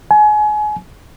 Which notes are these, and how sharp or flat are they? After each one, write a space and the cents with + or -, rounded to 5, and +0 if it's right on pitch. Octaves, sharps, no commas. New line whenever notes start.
G#5 +30